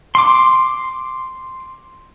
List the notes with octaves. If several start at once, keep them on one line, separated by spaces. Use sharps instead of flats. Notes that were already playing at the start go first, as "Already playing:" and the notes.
C6 D6